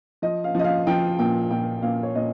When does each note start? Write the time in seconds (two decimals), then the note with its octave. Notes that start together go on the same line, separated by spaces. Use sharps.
0.22 F3 D#5
0.44 F5
0.55 F3 D#5
0.64 F5
0.87 F3 G5
1.19 A#2 G5
1.51 A#2 G5
1.82 A#2 F5
2.03 C#5
2.15 A#2 D#5